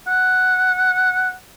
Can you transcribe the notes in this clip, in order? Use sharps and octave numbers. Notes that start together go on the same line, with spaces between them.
F#5